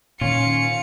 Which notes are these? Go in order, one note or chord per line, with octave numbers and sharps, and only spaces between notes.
A#2 D#3 C#4 F4 C#7